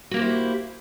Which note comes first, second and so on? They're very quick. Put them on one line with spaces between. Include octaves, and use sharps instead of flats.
F#4 A#3 G4 C5 E4